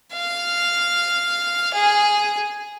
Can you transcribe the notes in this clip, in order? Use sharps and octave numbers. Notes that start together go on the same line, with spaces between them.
F5
G#4